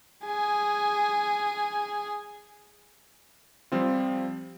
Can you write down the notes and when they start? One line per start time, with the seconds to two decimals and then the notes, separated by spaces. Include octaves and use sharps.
0.25 G#4 G#5
3.72 F3 G3 C4 F4